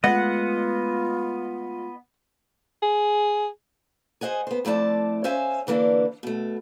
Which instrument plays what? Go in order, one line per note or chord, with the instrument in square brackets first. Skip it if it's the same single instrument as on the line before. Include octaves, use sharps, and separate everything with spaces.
[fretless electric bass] G#3 A3 [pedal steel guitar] B3 D#5 [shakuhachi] F4 [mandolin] F#5
[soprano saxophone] G#4
[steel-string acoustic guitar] G#4 C5 D#5 F#5 G#5
B3 C5
F2 A3 E4 D5 A5
C#4 C5 E5 F5 G#5
D3 E3 A#3 C4 D4
B2 A3